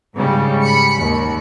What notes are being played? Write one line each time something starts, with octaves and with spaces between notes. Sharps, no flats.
G#2 C#3 G3
B5 C#7
D#2